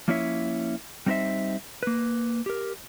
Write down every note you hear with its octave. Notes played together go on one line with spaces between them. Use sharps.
F3 A#3 C#4 E4 C#5 E5
G3 C4 D#4 B4 C5 E5
A#3 B4
G4 A#4